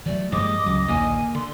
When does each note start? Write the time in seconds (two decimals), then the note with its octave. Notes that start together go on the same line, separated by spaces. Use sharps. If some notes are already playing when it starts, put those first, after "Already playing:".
0.06 E3 F#3 A3 D5
0.32 G2 E3 F3 G3 G#3 A#3 D#5 D6
0.66 C#2 F#3
0.88 A#1 D#2 D3 A#3 G#5
1.35 D3 C6